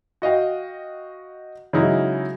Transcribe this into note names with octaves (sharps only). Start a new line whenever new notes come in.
F#4 D#5 F5 G5
C#3 F#3 G#3 D#4 E4 F#4